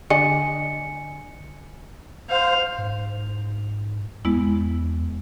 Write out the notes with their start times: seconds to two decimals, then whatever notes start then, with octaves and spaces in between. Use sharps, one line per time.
0.10 D3 D4 D5 D#5 G#5 C#7
2.30 C5 F5
2.79 G#2
4.25 E2 G#3 B3 E4